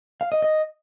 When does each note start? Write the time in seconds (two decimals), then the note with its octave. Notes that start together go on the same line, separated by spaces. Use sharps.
0.21 F5
0.32 D#5
0.42 D#5